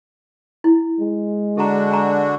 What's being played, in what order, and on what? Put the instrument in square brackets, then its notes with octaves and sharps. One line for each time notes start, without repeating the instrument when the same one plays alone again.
[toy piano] E4
[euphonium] G#3
[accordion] D3 D4 F#4 [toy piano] A4 A#5
[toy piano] G#5 A#5